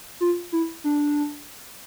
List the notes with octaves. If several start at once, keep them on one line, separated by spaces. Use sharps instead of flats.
F4
E4
D4